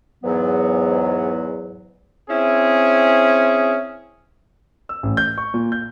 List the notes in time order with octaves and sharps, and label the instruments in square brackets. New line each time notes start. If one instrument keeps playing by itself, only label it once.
[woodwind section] E2 G#2 F#3 B3
[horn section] C4 C#4 E4 G#4
[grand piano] E6
A1
G6
C#6
A#2
G6